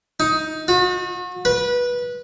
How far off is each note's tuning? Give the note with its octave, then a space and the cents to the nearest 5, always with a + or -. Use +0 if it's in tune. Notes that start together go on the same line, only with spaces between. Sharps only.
D#4 +15
F#4 -40
B4 -20